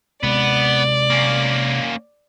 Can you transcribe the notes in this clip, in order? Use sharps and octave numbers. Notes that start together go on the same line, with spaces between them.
C3 G#3 B3 D5
A#3 C#4